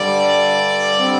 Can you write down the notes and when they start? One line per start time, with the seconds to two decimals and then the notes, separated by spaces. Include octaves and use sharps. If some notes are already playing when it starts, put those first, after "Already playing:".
Already playing: G2 D3 G3 D5
0.98 D3 G3 C4